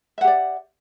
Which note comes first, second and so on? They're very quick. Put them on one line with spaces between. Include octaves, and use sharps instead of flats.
E5 F#5 G4 D5